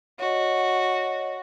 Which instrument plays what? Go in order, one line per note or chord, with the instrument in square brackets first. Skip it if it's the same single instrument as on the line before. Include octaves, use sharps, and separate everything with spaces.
[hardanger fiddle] F#4 [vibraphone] C#5 D#5